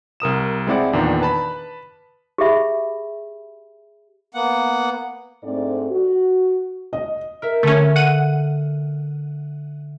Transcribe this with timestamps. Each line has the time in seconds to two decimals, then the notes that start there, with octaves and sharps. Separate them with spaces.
0.20 C2 A#4 D#6 E7
0.67 G#3 C4 E4 D5 F#5
0.93 E2 A#2 D#3 D4
1.21 B4 A5 B5
2.38 G4 G#4 E5 B5
4.34 A#3 B3 F#5
5.43 G#2 A3 C4 D4 A4 D5
5.91 F#4
6.93 D#5
7.42 A#4 E5
7.63 D3 A3 C#4 A4
7.96 F#5 D#7